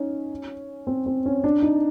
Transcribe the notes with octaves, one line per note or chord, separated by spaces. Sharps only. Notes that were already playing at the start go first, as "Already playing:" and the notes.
Already playing: C#4 D#4
C4
C4
C#4
D4
D#4